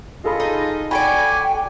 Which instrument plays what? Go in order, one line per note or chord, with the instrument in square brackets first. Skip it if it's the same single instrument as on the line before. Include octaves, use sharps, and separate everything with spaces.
[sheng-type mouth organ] F4 D#5 [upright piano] G#4 A4 B5
[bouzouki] D#4
[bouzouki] F#4 A4 D5 [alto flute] G5 [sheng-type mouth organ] G#5 [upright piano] B5